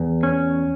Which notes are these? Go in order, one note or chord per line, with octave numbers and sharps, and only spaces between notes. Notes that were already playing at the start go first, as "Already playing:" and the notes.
Already playing: E2
C#4